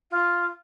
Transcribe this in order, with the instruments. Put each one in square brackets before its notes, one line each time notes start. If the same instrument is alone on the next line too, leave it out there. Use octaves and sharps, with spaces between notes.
[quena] F4